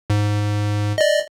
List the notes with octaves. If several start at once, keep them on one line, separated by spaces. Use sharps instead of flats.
G#2
D5 D#5